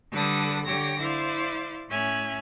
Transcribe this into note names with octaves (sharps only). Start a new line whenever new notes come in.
D3 G3 A4 B4 A5 D#6
D3 G4 C#5 G5 A#6
E4 C5 D5 F5
A2 C#4 E5 G#5 F6 F#6